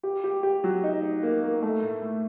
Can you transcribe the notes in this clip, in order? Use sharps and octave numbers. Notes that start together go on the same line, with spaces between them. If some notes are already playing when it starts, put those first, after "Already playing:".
G4
G4
G4
F#3
D#4
D#4
A#3
A#3
A3
A2
A2